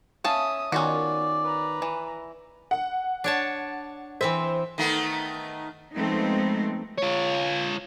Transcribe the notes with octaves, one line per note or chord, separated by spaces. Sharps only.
C#4 E5 F5 A5 D#6
D#3 B3 C#4 F4 F#4 D5
B4 A#5
E3
F#5
D4 C#5 A5
E3 C4 C5 E5
D#3 A3 B3
F3 G#3 A3 B3 C4 D#4
F4 C#5